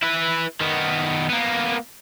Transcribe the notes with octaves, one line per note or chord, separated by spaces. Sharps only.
E4 B4
D#3 B3
A#3 B3